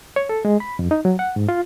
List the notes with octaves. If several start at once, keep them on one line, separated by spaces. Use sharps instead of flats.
C#5
A4
G#3
B5
F2
D#4
F#3
F#5
G#2
F4